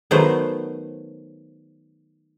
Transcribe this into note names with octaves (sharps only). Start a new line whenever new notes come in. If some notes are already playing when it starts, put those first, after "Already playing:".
D#3 F#3 A3 B3 C5